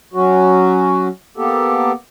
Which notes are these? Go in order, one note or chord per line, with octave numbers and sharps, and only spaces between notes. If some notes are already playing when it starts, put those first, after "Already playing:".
F#3 C#4 F#4
A#3 B3 G4 A4